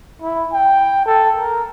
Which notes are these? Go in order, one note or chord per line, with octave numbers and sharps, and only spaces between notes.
E4
G5
A4
A#4